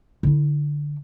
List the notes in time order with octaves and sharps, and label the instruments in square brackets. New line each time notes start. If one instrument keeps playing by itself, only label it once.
[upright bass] D3 E4